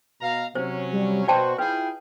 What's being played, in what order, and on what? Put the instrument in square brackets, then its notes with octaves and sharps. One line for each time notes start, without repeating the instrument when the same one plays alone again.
[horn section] B2 F5 A#5
[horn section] C3 F#3 C#4 [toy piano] C5
[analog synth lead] G3
[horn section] B2 F#4 [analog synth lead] C5 [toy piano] D5 G5 A5
[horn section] E4 F4 G#4 [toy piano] B4 [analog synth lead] G5